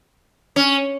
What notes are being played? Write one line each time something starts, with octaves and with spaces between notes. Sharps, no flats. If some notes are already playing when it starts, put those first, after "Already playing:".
C#4